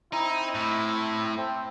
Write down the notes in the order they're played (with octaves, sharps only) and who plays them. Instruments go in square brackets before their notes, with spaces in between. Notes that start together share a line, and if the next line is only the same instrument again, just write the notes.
[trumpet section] C4 E4 [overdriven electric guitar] D#4
[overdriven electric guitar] A2
[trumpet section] C4 E5